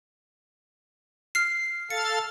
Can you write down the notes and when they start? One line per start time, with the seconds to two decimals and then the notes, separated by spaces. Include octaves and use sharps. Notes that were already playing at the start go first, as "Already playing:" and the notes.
1.35 F6 C7
1.90 A4 F5 A6 C#7